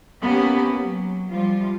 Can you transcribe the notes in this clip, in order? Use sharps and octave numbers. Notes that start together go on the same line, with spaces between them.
A#3 B3 C#4 G4
F#3
F3 G3 F4